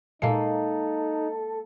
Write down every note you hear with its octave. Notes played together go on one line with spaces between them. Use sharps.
A#2 G#3 A#3 D#4 A4 C7